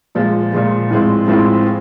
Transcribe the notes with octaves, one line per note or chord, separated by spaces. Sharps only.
A#2 F3 G#3
A#2 F3 G#3
A2 F3 G#3 C4
A2 F3 G#3 C4